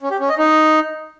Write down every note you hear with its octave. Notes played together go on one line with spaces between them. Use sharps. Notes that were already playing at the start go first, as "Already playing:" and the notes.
C#4
G4
C#4
D#5
D#4